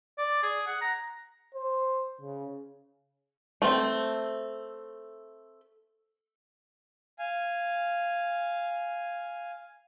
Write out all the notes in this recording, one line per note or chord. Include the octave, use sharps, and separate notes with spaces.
D5
G#4
F#5
A#5
C5
C#3
A3 C4
F5 G#5